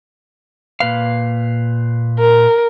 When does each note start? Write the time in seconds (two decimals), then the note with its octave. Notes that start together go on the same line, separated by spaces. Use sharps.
0.80 A#2 B4 F5
2.19 A#4